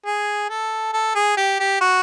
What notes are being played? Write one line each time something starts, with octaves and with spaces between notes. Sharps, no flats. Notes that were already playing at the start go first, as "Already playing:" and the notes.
G#4
A4
A4
G#4
G4
G4
F#4